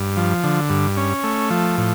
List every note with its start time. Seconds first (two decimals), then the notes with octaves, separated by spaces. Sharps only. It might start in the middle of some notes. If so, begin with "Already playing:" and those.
Already playing: G2
0.17 F3
0.43 D3
0.70 G2
0.97 C#4
1.23 A3
1.50 F3
1.77 A2